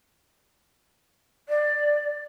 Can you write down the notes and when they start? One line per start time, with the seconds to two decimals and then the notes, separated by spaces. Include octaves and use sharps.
1.49 D5